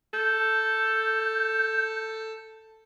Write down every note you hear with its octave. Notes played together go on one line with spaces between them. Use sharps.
A4 G6